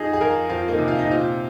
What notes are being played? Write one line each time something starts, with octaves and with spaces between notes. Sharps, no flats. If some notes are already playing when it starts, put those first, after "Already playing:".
Already playing: F2 D#4 G#4
G#4
F2 F4 A#4
F2 C4 F4
A#3 D#4
C3
F4
D#4
A#2 C4 F4